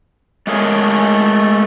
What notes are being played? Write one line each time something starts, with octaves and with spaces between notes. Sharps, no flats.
G#3 A3 G#4 A#4 C#5